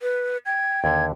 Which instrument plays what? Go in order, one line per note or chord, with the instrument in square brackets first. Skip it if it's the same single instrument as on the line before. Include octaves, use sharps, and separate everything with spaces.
[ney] B4
[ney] G5 [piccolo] G#6
[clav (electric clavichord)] D#2 D3 [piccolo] G#6